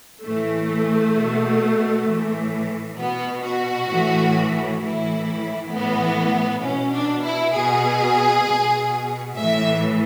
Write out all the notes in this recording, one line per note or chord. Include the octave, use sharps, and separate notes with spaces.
A2 E3 A3
B2
A2 E3
B2 B3
F#4
A2 E3
A2 E3 E4
A2 E3 B3
B2 C#4
D4
E4
B2 G#4
B2
A2 E3 E5